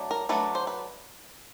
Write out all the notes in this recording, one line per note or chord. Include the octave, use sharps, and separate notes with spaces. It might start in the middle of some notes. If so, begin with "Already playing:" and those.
Already playing: F#3 A3 D4
A#4
F#3 A3 D4 B4
C5
B4